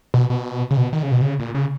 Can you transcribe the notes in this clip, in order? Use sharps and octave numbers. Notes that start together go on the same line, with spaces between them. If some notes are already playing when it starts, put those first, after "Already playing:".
B2
B2
C#3
B2
D#3
C#3
B2
C#3
A#2
C#3